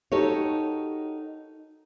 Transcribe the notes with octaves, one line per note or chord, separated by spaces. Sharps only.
D#4 F#4 G4 A4 A#4 C#5